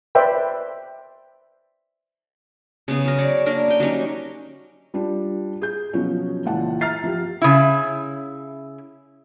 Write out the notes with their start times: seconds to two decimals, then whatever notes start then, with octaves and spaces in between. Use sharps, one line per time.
0.15 B4 C5 D5 E5 G5 B5
2.88 C#3 B3 G#4
3.05 F#3 A#4
3.18 C#5 D5
3.46 A#3 D4 A#4
3.68 C#4 G5
3.80 F#3 G3 C#4 D#4
4.94 G3 D4 F4
5.62 G#4 G6
5.93 B2 F3 F#3 C#4
6.45 C#2 A#2 E3 F#5 A5
6.81 E5 A#5 F6 A6 C7
7.04 F3 G4
7.42 C#3 E4